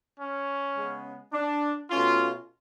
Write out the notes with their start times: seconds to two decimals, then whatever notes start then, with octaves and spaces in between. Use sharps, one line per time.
0.19 C#4
0.75 C#3 G#3 B3
1.33 D4
1.90 B2 A3 C#4 F4